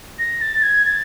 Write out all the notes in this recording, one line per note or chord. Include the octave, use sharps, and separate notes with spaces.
A#6
A6
G#6
A6